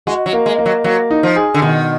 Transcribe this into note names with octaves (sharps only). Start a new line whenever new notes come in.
G#3 F#4
F#3
A#3
G#3
A#3
F#3
F#3 A#3
D#4
F3
G#4
D3
B2 D#3